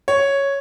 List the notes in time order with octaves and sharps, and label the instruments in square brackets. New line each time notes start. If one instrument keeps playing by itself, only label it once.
[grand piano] C#5